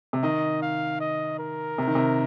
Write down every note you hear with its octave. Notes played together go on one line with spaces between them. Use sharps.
C3
D#3 D#5
F5
D#5
A#4
C3
D#3
C3